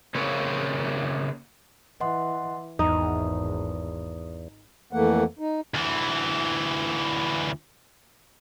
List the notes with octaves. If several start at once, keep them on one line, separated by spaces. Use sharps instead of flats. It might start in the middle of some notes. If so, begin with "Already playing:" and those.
C#3 A#3 C4 G#4 B4 C#5
E3 D#5 F#5 C6
G#1 E2 D#4 D#6
F2 E3 A3 A#3 F#5
D#4
D2 E3